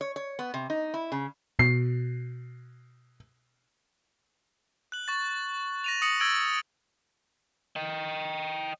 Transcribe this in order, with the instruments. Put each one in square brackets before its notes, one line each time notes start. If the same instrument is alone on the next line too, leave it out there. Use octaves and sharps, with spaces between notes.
[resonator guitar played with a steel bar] C#5
C#5
B3
C3
D#4
E4
C#3
[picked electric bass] B2 [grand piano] C7
[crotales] F#6 F#7
C#6 A6
A#6 D#7 F7
D#6 A#6 C#7 F#7
E6 G#6 A6 D7 F#7
[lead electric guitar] D#5 G5